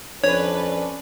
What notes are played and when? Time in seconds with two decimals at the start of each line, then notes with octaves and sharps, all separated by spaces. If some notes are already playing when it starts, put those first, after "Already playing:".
0.24 F2 C#4 D4 B4 C#5